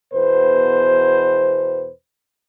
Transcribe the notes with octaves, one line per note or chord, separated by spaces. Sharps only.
E2 B2 B4 C5